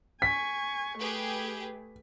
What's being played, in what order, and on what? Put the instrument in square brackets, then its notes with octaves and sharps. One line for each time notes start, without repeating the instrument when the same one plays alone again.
[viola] G#5 C#6 [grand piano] B6
[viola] A3 [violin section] G4 G#4 B4